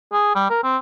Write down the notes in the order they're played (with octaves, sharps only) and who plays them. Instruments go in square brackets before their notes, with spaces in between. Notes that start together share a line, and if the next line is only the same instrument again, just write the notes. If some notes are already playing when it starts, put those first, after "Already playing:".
[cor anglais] G#4
G3
A#4
C4